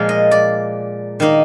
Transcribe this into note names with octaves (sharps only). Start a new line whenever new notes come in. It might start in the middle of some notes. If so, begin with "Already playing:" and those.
Already playing: A#2 F3 G#3 F5
D#5
D5
D#3 A#3 D#4